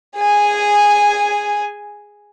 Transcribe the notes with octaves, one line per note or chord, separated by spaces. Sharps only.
G#4 G#5